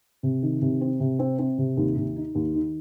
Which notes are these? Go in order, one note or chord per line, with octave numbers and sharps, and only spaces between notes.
C3
D#3
C3
C4
C3
C4
C4
C3
D#2
D#2
D#4
D#2
D#3